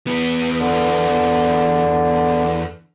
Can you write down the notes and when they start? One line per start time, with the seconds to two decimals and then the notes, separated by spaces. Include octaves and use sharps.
0.07 E2 B3
0.60 D3